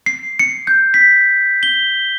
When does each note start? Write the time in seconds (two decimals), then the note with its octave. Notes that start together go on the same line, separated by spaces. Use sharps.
0.06 C7
0.39 C#7
0.67 G6
0.94 B6
1.63 G7